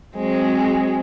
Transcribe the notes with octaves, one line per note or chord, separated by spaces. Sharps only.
F#3 G#3 C4